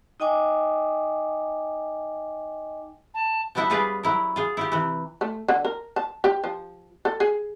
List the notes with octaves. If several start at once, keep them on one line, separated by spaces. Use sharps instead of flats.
D#4 D#5 G5 G#5 D6
A5
F3 G3 B3 E4 E5 F#5
G3 C#4 F4 G#4 B4 D5
F#3 E4 A#4
F4 G#4
E4 F4 G4
C3 E3
A3
D3
A#4
A5
G4
F3
A4
G#4